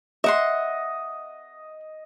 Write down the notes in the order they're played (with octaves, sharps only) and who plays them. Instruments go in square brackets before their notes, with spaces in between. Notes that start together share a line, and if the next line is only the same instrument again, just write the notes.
[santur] D#5 [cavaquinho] E5 F#5 C6